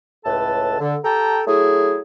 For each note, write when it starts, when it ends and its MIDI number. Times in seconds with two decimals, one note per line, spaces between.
0.26 0.79 37
0.26 0.79 45
0.26 0.79 69
0.26 0.79 71
0.26 0.79 81
0.80 0.96 50
1.04 1.41 67
1.04 1.41 69
1.04 1.41 79
1.04 1.41 81
1.04 1.41 82
1.47 2.00 54
1.47 2.00 57
1.47 2.00 64
1.47 2.00 68